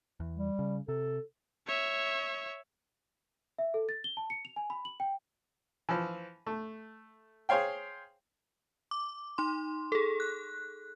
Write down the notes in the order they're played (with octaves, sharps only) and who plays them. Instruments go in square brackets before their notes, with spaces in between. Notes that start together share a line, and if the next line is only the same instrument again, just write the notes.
[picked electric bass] E2
[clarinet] G3
[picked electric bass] C#3
[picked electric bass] C3 [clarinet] A4
[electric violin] C#5 E5
[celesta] E5
A4
A6
G7
A5
C#7
F7
G#5
B5
F#7
G5
[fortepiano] E3 F3
A3
G#4 C5 C#5 F5 G5
[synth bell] D6
D#4 C6
G#4 A4
F#6